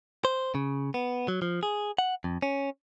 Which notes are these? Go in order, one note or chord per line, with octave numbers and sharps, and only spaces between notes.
C5
C#3
B3
F#3
F3
G#4
F#5
F2
C#4